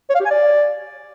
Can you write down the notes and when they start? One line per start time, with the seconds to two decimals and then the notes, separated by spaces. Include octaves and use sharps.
0.10 C#5
0.15 F5
0.20 G4
0.25 G#5
0.30 D5